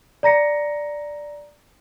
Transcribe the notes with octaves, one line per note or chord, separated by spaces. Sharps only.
D5 A#5 A#6 C#7